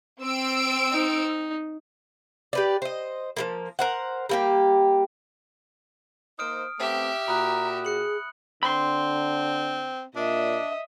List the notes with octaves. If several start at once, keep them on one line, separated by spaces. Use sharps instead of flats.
C4 E6 D7
D#4
G4 B4 D5
C5 D#5
F3 G3 A#3
A#4 C5 F#5
G3 A#3 G4
A#3 D#4 C5 D#6 F6 D7
A3 B3 C4 G4 E5
A#2 F#4 A#5 B5 D#6 F#6
G#4 F#6 C#7 F#7
D3 C4 B5 C6
A#2 D4 D#5 E5